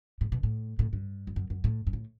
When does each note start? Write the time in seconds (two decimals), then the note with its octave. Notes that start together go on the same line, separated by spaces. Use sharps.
0.21 A2
0.32 B2
0.43 A2
0.79 A2
0.93 G2
1.27 E2
1.36 F#2
1.50 F#2
1.64 A2
1.87 G2
1.93 A2